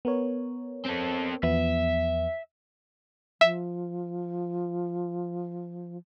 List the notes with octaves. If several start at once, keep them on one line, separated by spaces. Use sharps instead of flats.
B3 A#4 C#5
C4 A4
E2 F3 B3 E5
F3 E5